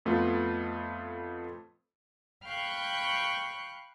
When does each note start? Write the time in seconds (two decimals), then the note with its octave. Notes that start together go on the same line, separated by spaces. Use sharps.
0.05 F2 A3 B3 F4
2.44 F5 G5 B5 C#6 F#6 G6